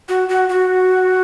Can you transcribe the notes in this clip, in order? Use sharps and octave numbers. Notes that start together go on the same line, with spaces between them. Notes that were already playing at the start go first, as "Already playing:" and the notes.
F#4
F#4
F#4